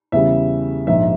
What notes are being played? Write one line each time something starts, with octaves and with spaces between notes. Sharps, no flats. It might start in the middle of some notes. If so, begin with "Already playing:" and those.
E2 C#3 G3 E5
A#1 G#2 F3 E5